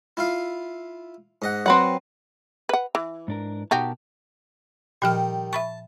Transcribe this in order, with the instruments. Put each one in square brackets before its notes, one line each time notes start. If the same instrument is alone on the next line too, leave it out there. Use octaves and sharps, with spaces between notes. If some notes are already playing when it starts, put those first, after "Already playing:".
[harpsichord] E4 F4 F5
G#2 D#5 F#5
[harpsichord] F#3 [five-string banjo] C4 B4 F#5
[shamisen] B4 F#5
E3
[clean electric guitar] G#2 D4 A#4
[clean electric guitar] B2 A#4 A5 [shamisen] D#4 F#4 G4
[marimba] A#2 F3 F6 [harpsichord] D#3 G3
[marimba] E5 B5 C#6 [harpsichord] A5